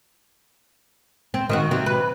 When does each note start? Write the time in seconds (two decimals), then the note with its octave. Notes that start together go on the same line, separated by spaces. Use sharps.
1.34 C4
1.49 D#3 C4 F#4
1.71 C3 F#3 C4
1.86 B4